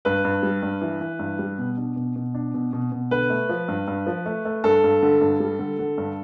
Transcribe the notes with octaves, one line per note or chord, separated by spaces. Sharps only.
G2 B4
G2
G3
G2
E3
E3
G2
G3
B2
D4
B2
B2
D4
B2
B2
B2
D3 B4
A3
F3
G2
G2
F3
A3
A3
G2 A4
G2
D3
G2
G3
D3
D3
G2